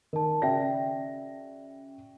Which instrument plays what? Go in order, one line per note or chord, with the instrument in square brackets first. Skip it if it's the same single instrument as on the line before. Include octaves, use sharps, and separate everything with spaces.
[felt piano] D#3 [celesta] A#4 A5
[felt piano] C#3 F#4 A#6 [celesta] D5 E5 G5